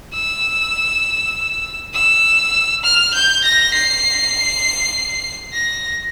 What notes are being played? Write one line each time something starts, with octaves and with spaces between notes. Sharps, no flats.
E6
E6
F6
G6
A#6
C7
A#6